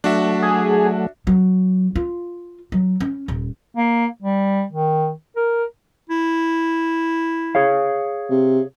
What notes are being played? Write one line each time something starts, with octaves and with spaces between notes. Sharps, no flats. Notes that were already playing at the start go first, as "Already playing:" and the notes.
F#3 A3 D4 F#4 E5
G#4
F#3
F4
F#3
C#4
D#1
A#3
G3
D#3
A#4
E4
G#4 C#5 F5
C3